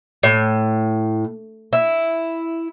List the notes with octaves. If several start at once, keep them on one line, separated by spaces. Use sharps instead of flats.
A2
E4